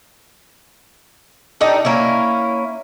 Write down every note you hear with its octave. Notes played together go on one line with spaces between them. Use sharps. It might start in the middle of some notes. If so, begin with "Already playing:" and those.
D4 D#4 G4 A4
A#3 C#4 E4